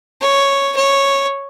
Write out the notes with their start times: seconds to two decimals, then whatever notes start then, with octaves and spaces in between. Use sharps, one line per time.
0.22 C#5
0.76 C#5